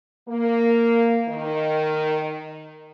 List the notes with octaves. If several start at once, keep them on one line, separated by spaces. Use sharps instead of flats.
A#3
D#3